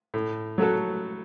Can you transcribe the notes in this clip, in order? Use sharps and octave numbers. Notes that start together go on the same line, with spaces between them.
A2
F#3 A3 F#4 A4